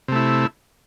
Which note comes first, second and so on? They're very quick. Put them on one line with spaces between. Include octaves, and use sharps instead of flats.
C3 A3 E4